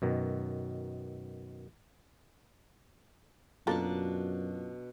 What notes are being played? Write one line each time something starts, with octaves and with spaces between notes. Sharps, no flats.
F#2 B2 D#3
F#2 B2 A#3 D4 F4 A4 A#4 A5